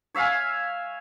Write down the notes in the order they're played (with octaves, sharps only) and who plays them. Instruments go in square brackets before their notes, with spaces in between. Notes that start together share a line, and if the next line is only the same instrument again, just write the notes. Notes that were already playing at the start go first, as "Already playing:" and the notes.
[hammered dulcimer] C#5 E5 F5 G#5